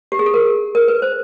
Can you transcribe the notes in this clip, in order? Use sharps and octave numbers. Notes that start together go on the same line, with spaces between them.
G4
G#4
A4
A#4
A#4
B4
C5